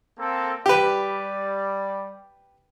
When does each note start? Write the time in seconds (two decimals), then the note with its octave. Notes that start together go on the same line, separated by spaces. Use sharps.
0.19 A#3 C4 A4
0.66 G3 G4 B4 D5